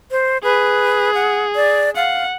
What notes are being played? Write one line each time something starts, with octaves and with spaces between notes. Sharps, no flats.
C5
G#4 B4
F#5
D5
F5 F#5